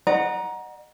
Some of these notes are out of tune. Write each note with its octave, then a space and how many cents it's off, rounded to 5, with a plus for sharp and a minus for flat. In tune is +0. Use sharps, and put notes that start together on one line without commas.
D#5 -30 F#5 +0 A#5 +20